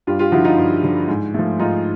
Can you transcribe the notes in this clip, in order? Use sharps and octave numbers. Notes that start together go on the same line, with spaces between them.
G2 F4 G4
F4 G4
D3 F3 E4 F#4
D#4 F4
G2
D3 F3
G#2
F3 A3
G#2 D#4 F4